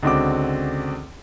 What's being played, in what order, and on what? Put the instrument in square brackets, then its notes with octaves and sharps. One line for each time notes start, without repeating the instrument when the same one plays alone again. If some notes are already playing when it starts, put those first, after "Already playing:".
[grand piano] C#2 D3 C4 F#4 D6